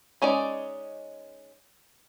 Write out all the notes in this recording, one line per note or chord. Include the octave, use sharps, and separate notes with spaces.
G#3 C#4 D#4 D5